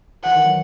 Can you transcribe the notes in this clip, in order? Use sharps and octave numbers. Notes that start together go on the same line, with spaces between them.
E3 F#5
D#3
F#3